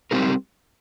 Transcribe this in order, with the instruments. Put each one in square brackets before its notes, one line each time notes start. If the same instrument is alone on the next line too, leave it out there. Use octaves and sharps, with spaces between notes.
[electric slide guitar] G3 C4 D#4 G4 A#4